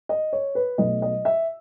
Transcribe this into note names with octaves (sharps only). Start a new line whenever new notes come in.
D#5
C#5
B4
B1 B2 A3 D#5
D#5
E5